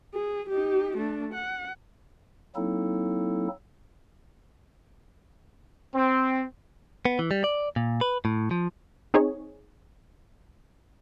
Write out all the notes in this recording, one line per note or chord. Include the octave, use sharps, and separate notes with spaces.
G#4
D#4 G4
A3 D4
F#5
F#3 A#3 C4 D#4 E4 A4
C4
B3
E3
G3
D5
A#2
B4
A2
F3
C4 D#4 G#4 C#5